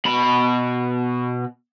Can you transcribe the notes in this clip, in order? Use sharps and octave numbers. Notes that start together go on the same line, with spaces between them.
B2 B5